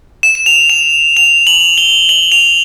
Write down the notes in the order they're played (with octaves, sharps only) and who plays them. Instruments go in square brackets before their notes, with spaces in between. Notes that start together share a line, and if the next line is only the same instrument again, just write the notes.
[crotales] E7
E7
F7
F7
F7
F#7
G7
F#7
F7